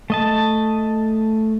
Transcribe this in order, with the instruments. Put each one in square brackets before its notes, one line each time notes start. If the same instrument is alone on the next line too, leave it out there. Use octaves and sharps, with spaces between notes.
[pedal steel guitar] A3 D#5 A5